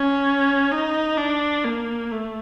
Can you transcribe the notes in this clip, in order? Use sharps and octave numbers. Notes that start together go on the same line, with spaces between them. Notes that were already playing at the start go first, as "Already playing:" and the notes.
Already playing: C#4
D#4
D4
A#3
A3